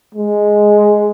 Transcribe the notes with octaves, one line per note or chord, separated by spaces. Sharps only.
G#3